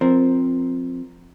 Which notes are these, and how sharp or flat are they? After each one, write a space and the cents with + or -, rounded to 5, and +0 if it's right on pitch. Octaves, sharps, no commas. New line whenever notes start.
F3 +0 C4 +0 A#4 -5